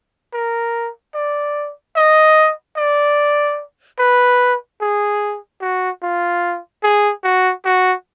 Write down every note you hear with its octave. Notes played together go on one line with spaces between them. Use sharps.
A#4
D5
D#5
D5
B4
G#4
F#4
F4
G#4
F#4
F#4